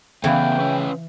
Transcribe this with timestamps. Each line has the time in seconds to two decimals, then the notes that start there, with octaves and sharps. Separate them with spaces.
0.24 C#3 E3 A3 B3 G#4 F5 G5 B5
0.60 C#4 B4 C#5